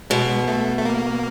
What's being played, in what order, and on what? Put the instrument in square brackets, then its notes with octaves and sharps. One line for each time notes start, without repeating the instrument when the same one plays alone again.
[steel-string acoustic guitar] B2 [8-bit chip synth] G#3
[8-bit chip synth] A3
A3
A#3